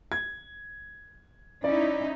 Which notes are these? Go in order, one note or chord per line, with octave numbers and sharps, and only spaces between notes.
G#6
C#4 D#4 E4 D5